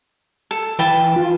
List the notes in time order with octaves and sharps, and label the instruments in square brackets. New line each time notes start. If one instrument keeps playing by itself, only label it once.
[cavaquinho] A4
[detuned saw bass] E3 [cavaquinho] B4 G5 A5
[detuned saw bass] F4